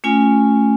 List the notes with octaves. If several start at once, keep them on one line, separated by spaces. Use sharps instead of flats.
A3 C#4 F4 G#5